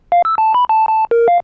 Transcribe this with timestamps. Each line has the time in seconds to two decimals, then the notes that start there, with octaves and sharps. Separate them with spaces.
0.12 F5
0.25 E6
0.38 A5
0.54 B5
0.69 A5
0.89 A5
1.11 A#4
1.28 F5